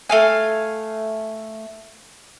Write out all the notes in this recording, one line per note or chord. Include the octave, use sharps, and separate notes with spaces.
A3 F5 G#5